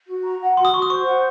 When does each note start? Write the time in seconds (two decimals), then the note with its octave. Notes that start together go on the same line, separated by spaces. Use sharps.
0.08 F#4
0.24 A#5
0.41 F#5
0.57 F#4 C6
0.65 D#6
0.73 F#4 C#6
0.82 D#6
0.90 C5 C#6
1.06 F#5